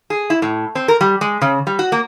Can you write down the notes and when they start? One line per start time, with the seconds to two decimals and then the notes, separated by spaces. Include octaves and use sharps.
0.10 G#4
0.30 E4
0.42 A2
0.75 C4
0.88 A#4
1.01 G3
1.21 G#3
1.41 C#3
1.67 G3
1.79 F#4
1.92 A#3